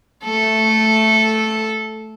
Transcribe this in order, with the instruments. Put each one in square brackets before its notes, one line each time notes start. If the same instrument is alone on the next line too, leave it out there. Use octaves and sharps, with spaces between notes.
[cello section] A3 [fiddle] A4